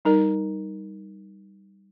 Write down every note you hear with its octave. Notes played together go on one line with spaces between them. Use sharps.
G3 D#4 A#4